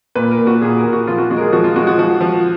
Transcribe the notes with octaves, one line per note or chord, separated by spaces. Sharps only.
A#2 B4
A#4
A#2
F#4
A#2 G#4
A#4
A#2
F#4
F3 F4
F#4
G#3 F#4
A#4
G#4
F3 F#4
F4
G#3 F#4
F#4
F3 F#4
F3